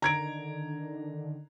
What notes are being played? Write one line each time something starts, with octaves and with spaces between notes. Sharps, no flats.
D3 D#3 A#5 G#6 D7